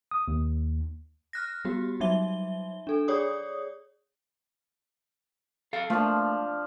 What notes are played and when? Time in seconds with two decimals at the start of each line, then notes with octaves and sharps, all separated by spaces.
0.11 D#6
0.28 D#2
1.33 F6 F#6 A#6
1.65 G3 B3 F#4 G4
2.00 F#3 G3 D#4 E5 G7
2.87 D4 A4
3.08 G#4 C#5 D5 D#6
5.73 A4 F5
5.90 F3 A3 A#3 D4